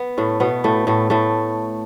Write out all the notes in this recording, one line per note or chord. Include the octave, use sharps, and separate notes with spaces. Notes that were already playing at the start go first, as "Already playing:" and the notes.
Already playing: B3
A2 A3
B2 B3
A2 A3
A2 A3
A2 A3